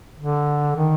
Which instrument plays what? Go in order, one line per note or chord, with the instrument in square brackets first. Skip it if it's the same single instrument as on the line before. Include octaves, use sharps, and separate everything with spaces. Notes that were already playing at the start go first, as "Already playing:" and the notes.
[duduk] D3
D#3